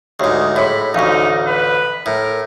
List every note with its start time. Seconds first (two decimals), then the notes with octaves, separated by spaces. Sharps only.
0.20 D2 G#2 G4 C#5 F#5
0.56 A2 F#4 G#4 C#5 B5
0.95 A1 D2 D#4 F5 G5 C#6
1.47 B4
2.06 A2 A#4